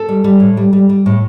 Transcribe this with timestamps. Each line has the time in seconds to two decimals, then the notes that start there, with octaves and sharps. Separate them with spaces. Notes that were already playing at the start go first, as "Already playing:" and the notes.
Already playing: A4
0.09 G3
0.24 G3
0.40 A2
0.57 G3
0.73 G3
0.89 G3
1.06 A2